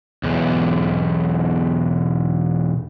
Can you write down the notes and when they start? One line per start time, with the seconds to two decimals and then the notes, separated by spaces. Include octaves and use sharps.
0.23 B1 E2